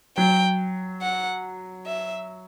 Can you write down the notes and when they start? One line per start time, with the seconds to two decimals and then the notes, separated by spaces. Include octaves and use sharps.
0.17 F#3 G5
1.02 F#5
1.86 E5